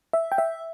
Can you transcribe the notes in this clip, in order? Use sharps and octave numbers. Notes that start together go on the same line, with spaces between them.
E5
G5
E5